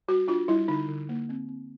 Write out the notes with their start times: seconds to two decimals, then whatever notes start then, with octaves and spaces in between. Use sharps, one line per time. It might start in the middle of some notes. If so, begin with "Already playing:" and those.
0.08 G3 F#4
0.28 D4 F4
0.48 G3 E4
0.68 D3 D#4
0.88 D3
1.09 A#3
1.29 C4
1.49 C4